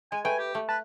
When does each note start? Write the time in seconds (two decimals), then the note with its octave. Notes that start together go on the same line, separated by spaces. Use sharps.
0.12 G#3 G#5
0.25 A3 B4 G5 G#5
0.39 G4
0.55 A3
0.69 B4 A5